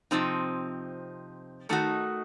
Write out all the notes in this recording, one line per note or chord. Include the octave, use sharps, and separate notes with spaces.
C3 F3 C4 D#4
D#3 A3 D#4 F#4